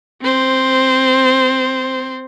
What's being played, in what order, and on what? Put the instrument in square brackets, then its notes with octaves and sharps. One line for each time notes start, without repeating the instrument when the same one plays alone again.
[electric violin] C4 C5